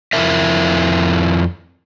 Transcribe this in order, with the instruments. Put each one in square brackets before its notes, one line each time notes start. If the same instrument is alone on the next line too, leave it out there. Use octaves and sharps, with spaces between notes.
[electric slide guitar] F2 G3 E4 F4 A#4 E5